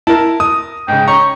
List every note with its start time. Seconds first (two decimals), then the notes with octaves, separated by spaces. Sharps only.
0.07 E4 A#4 A5
0.40 D#6
0.88 G#2 C#3 G5
1.08 C#4 A#5 C#6